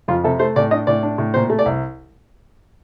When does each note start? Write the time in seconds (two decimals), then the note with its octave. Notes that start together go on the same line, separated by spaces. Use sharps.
0.08 F2 F4
0.24 C3 A4
0.39 A3 C5
0.56 A2 D5
0.71 D4 D#5
0.87 A2 D5
1.03 D4
1.18 A2
1.34 A#2 C5
1.50 A3
1.59 D5
1.66 C2